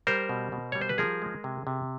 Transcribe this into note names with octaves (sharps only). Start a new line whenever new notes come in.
G3 A#4 C5
B2
B2
G3 C#5
C5
B4
F3 G#4 A#4
G#3
C3
C3